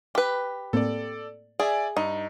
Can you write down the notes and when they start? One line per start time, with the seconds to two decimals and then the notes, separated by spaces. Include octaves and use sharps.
0.15 G4 B4
0.73 A2 A#3 C4 A4 D5
1.60 G#4 D5 E5 G#5
1.97 G2 D#4